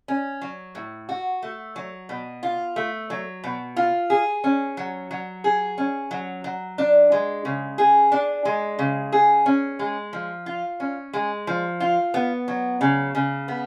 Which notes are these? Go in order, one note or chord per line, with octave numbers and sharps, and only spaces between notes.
C#4
F#3
A2
F#4
A3
F#3
B2
F4
A3
F#3
B2
F4
G#4
C#4
F#3
F#3
G#4
C#4
F#3
F#3
D4
G#3
C#3
G#4
D4
G#3
C#3
G#4
C#4
G#3
F3
F4
C#4
G#3
F3
F4
B3
F#3
C#3
C#3
B3